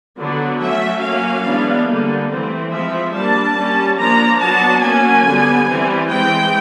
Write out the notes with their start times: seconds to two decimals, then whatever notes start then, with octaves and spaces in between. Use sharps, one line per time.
0.17 D3 F#3 B3 D4
0.59 F#3 A3 C#4 E5
1.01 F#3 A#3 C#4 F5
1.45 E3 G#3 B3 D4
1.86 D3 G3 A#3
2.29 E3 A3 C4
2.71 F3 G#3 C4 E5
3.13 G3 A#3 D4 A5
3.56 G3 A#3 C#4
3.98 F3 A#3 D4 A#5
4.41 F#3 B3 D4 A5
4.82 F#3 A#3 C#4 G#5
5.25 D3 G3 B3
5.68 E3 G3 C4
6.10 E3 G#3 C4 G5